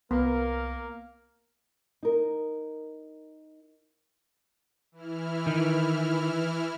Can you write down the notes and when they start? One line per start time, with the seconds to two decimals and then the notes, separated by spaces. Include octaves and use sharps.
0.11 C2 A#3 B3 A#4
2.03 D#4 A#4
4.92 E3 E4 F6
5.46 D#3